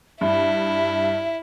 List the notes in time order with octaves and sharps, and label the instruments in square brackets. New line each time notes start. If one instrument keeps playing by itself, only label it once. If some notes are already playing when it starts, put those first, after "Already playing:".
[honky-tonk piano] G2 [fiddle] E4 [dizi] E5